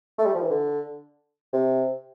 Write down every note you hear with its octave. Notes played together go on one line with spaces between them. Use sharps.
A3
G3
F3
E3
D3
C3